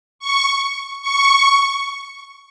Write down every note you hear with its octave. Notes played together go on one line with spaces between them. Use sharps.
C#6
C#6